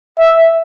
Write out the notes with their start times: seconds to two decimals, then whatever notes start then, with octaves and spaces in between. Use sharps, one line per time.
0.18 E5